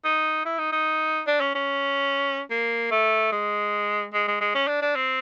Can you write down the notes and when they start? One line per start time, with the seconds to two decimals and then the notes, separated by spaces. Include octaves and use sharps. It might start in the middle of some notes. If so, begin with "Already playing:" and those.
0.05 D#4
0.46 E4
0.59 D#4
0.72 D#4
1.27 D4
1.41 C#4
1.55 C#4
2.51 A#3
2.91 A3
3.32 G#3
4.14 G#3
4.28 G#3
4.41 G#3
4.55 C#4
4.68 D4
4.82 D4
4.96 C4